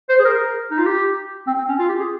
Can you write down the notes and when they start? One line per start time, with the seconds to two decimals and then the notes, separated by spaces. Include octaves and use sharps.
0.09 C5
0.20 G#4
0.25 A#4
0.71 D#4
0.78 F4
0.85 G4
1.47 C4
1.58 C4
1.68 C#4
1.79 F4
1.89 G4
2.00 G#4